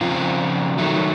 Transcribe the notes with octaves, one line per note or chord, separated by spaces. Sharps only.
C#3 F3 C4 F4
D#3 F#3 A3